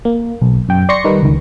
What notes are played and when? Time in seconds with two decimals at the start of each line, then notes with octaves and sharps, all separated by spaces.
0.05 A#3
0.42 B1
0.69 F#2 G5
0.89 D5 C6 C#6 A#6 C#7
1.05 D#3 G3 D#4 B4
1.23 C#2 D#3